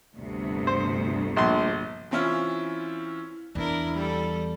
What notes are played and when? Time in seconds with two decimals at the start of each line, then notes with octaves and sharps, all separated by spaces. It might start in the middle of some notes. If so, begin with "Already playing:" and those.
0.17 G1 D2 C3
0.67 C5
1.37 A#1 C6
2.11 E3 C4 C#4 E4 F4
3.55 E2 D4 E4 A#4
3.93 G3 A4